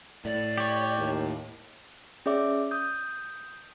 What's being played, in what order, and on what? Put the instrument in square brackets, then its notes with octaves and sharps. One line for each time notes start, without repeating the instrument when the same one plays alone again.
[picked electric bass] A2 [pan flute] D5
[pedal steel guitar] G4 C#5
[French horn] D#2
[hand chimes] C#4 G#4 D5 E5 D6
D#6 G6